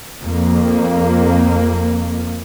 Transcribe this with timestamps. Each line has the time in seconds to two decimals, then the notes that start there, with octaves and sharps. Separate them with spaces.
0.23 F2 A#3